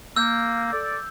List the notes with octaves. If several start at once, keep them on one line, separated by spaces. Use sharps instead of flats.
A#3 E6 G6
A4 D5